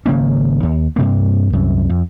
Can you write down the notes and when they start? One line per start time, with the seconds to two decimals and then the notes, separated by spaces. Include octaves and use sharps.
0.06 G#1 C#3 A#3 C#4
0.63 D#2
0.96 G2 C3 A#3
1.53 C2 F#2
1.90 F2